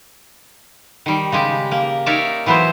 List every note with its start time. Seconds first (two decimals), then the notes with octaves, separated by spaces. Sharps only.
1.06 D#3 G3
1.32 C#3 G#3 G4
1.71 A#3
2.06 D#4 A#4 C#5 D5 E5
2.46 E3 F#3 B3 E4 C5